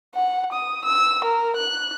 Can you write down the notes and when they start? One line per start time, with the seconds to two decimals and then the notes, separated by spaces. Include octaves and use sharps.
0.14 F#5
0.52 D#6
0.85 E6
1.25 A#4
1.56 F#6